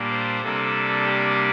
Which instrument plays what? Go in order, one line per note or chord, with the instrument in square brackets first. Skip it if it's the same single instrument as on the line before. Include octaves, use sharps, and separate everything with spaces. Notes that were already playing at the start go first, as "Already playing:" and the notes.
Already playing: [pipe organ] A#2 G3 A#3 D4
C5
C3 G3 A#3 D4 A4
G4